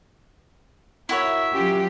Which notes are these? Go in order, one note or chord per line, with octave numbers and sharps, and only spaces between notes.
E4 F#4 A#4 C#5 E5
F#3 C#4 F4 G4